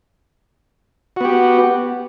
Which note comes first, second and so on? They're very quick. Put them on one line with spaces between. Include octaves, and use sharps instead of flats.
F#4 B3 G4